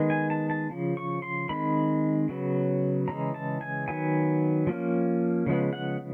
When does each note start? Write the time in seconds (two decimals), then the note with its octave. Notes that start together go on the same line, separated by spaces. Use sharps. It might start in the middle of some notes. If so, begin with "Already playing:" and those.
Already playing: D#3 G#3 B3
0.10 G#5
0.30 A5
0.50 A5
0.70 C#3 F3
0.97 C#6
1.22 C6
1.49 D#3 G#3 C4 B5
2.29 C#3 F#3 B3
3.08 C#3 E3 G#3 A#5
3.34 A5
3.61 G#5
3.88 D#3 F#3 B3 G#5
4.67 F3 A#3 C#4
5.46 C#3 F3 G#3 B3
5.73 F#5